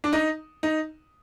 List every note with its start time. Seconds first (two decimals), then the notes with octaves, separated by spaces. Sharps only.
0.04 D4
0.13 D#4
0.63 D#4